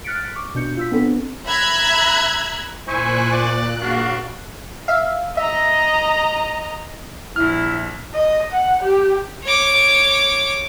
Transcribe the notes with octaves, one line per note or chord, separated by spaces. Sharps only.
F6 F#6 A6 B6 C#7 D7
C#6 D6
B2 D4 G6 C#7
F4 E6 B6
B3 C4 D4 A4
E5 A#5 B5 E6 F#6 G#6
A#2 E4 C5 G#5 C#6 F#6
D5
C#3 D4 F#4 F5
E5 F5
D#5 E5 A#5
A#1 E4 F6
D#5
F#5
G4
C#5 D6